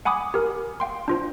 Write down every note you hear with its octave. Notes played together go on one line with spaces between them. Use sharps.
F#5 G#5 B5 D6 D#6
G4 A#4
F5 G5 C6
D4 F4 C5